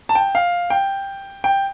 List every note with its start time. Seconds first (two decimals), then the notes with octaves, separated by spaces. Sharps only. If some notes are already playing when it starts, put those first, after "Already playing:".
0.09 A5
0.15 G5
0.35 F5
0.70 G5
1.44 G5